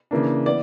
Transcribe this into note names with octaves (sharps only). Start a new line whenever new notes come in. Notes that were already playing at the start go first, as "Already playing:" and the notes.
C#3 E3 A#3 D4
E3 B3 D5